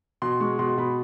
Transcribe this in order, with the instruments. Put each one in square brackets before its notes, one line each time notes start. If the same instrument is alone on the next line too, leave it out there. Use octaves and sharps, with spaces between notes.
[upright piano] B2 C6
G#3 C#6
B2 C6
B2 B5